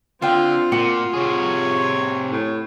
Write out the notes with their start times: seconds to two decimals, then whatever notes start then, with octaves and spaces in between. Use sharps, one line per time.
0.22 D3 C4 F4 F5 G5
0.72 A#2 F#4
1.13 C3 G#4 C#5
2.32 A2